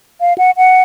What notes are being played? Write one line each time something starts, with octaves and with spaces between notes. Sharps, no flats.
F5
F#5
F#5